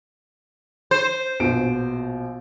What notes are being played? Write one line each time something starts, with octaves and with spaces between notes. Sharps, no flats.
C5
A#1 B2 D7